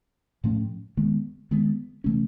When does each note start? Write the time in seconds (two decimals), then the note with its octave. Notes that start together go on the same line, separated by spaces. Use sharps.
0.44 A2 F3 A3 C#4
0.97 D#3 G#3 B3
1.51 D#3 G#3 B3
2.04 C3 E3 A3 C#4